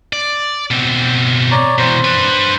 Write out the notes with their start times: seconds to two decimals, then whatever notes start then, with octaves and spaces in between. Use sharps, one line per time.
0.13 D5
0.71 B2 C4
1.51 C#5 D5 A#5
1.78 B2 E3 C5
2.05 D4 B4